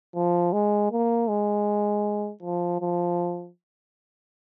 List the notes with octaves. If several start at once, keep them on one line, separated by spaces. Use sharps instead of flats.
F3
G#3
A#3
G#3
F3
F3